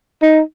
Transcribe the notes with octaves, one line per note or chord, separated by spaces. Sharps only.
D#4